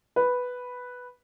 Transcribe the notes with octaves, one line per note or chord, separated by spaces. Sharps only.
B4